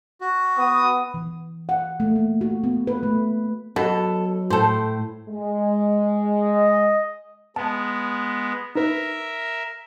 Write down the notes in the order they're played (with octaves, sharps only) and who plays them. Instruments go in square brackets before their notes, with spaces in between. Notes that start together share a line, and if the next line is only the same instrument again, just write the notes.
[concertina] F#4
[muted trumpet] B3 [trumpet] D#6
[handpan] E3
F#5
A3
A#3
F#4
B3
B4
A3
[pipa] B2 [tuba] F#3 [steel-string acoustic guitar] A4
[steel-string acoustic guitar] A2 [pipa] A4 C5
[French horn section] G#3
[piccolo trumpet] D#5
[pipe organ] G#3 B3 [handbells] A5
[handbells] D#4 B4 [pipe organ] A#4 E5